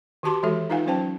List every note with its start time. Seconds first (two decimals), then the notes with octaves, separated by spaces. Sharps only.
0.23 D#3 F#4 G4 A5 C6 D6
0.43 E3 G#3 F#4 A4 E5
0.70 D#4 F4 B4 F5 F#5 G#5
0.86 F#3 C#4 C5 G5 A5